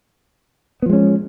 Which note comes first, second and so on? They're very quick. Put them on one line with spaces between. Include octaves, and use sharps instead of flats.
B3 F3 G#3 C#4